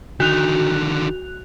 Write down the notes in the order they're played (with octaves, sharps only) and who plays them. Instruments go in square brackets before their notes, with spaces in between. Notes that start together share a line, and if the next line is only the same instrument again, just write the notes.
[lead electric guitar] D3 D#3 [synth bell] F#4 F#6 F7